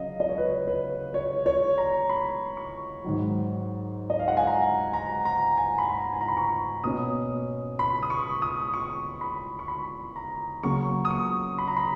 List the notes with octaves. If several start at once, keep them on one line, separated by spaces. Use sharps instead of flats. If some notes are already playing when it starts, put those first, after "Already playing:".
Already playing: C#3 F#3 D#5 F5
D#5
C#5
B4
C#5
B4
C#5
C#5
A#5
B5
C#6
G#2 D#3 F#3
D#5
F5
F#5
G#5
A#5
A#5
A#5
G#5
B5
A#5
G#5
A#5
B5
C#6
B2 A#3 C#4 D#6
B5
D#6
C#6
D#6
C#6
B5
C#6
B5
A#5
C#3 F#3 A#3 C#6
D#6
C#6
B5
A#5
B5